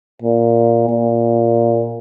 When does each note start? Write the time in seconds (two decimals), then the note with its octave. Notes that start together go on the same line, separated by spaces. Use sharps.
0.22 A#2
0.89 A#2